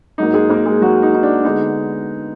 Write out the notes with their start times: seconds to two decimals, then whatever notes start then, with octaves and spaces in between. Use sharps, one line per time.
0.18 G#2 F#3 A#3 D#4
0.34 G#3 G#4
0.50 A#3 A#4
0.66 G#3 G#4
0.81 F#3 F#4
1.03 D#4
1.15 D#4
1.23 D4
1.45 D3 G#3 B3 D#4